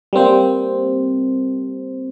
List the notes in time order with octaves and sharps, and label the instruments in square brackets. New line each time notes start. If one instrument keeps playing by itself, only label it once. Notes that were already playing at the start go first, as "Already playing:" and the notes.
[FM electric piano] G3 A#3 C4 C5